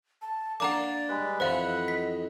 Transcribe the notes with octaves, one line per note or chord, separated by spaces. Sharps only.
A5
A#3 D4 A#4 D5 F#5 A#5 D6
G3 G#3 B4
F2 E3 B4 C5 F5 F#5
D#5
B6